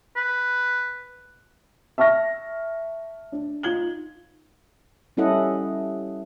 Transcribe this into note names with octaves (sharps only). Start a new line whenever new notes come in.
B4
E5 A5 C#6 F6 A#6
D4
D#4 F4 G#6 F#7 G7
G3 C#4 E4 A4 D#5 F#5